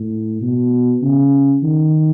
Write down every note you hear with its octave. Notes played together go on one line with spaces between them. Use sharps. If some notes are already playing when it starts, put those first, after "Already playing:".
Already playing: A2
B2
C#3
D#3